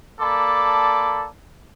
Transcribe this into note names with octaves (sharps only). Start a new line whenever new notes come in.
A#3 A4 D5 A5 B5 D6